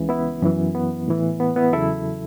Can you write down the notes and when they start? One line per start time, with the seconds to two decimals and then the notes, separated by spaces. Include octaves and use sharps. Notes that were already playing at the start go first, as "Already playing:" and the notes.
Already playing: C#2 C#3 E3
0.09 B3 E4
0.42 F#2 E3
0.75 B3
1.08 A2 E3
1.40 B3
1.56 B3 E4
1.72 E2 C#3 F#3 E4 A4